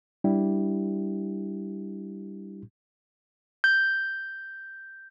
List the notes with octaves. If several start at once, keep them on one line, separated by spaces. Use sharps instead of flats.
G3 D4 E4 G4
G6